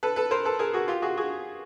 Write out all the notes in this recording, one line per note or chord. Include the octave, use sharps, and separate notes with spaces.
A4 B4
A4 B4
A#4 C5
A4 B4
G#4 A#4
F#4 G#4
F4 G4
F#4 G#4
F#4 G#4